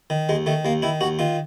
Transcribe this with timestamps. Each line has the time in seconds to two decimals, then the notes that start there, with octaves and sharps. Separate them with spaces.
0.10 D#3
0.29 D#2 G#3
0.46 D#3 A3
0.65 D#2 A#3
0.82 D#3 E4
1.01 D#2 F#4
1.19 D#3 F4